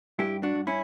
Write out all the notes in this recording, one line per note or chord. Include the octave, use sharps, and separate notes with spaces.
G2 E4 G4
D4 F#4
G2
C#4 E4